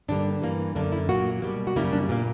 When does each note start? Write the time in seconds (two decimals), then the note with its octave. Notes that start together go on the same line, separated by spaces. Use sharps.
0.08 G2 D3 G3 A#3 D4
0.42 G2 E3 A#3
0.75 F#2 D3 A#3 D4
0.92 E4
1.09 A#2 F#3 A#3 F#4
1.42 B2 G3 A#3
1.67 F#4
1.76 F#2 C#3 G3 A#3 E4
1.93 D4
2.09 A#2 A#3